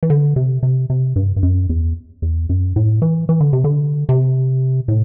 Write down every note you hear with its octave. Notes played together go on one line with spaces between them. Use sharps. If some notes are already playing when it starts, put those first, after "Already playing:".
E3
D3
C3
C3
C3
G2
G2
F#2
E2
E2
F#2
A2
E3
E3
D3
C3
D3
C3
A2